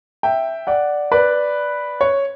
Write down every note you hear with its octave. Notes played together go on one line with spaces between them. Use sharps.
E5 G5
D5 F#5
B4 D5
C#5